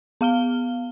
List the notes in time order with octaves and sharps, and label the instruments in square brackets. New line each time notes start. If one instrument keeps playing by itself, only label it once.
[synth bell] B3 F5 F6 G7